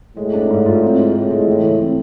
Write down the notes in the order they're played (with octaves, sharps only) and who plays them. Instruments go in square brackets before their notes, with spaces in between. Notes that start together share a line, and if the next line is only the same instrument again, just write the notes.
[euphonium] A2 [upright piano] G#3
[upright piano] D4
G#2
F4
C4
G#3
[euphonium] A2 [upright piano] G#3
[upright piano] G#3
[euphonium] A2 [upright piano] E3
[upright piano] E3
C4